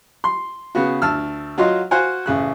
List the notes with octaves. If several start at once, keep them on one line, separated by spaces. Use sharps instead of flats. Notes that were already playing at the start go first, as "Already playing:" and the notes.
C6
C#3 B3 F#4
D2 A5 E6 F6
F#3 F4 F#4 D#5 C6
F#4 C5 F5 F#5 G#5
A1 C#3 F#6